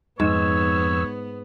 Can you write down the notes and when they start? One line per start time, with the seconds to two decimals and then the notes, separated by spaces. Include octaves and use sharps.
0.20 F2 G#2 B3 C#5 E6